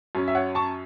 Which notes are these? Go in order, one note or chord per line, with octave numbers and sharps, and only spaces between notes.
F#2 F#3 C#4
E5
C#5 F#5
A5 C#6